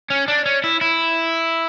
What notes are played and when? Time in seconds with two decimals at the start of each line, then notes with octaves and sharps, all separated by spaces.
0.10 C#4
0.28 D4
0.46 C#4
0.64 E4
0.81 E4